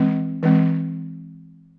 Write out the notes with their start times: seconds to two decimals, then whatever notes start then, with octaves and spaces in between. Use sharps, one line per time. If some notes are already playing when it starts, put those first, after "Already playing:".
Already playing: E3 G#3 C4
0.43 E3 G#3 C4